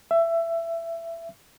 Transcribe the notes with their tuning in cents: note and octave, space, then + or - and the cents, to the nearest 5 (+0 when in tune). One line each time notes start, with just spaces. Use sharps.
E5 +20